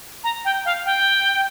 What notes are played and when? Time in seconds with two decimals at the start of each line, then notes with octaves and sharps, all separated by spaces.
0.24 A#5
0.45 G5
0.65 F5
0.86 G5